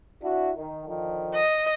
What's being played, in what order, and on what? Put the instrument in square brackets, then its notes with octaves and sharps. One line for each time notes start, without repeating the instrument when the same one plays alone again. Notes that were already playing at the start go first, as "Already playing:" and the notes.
[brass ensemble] D4 E4 F#4
D#3
D3 D#3 F3
[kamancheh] D#5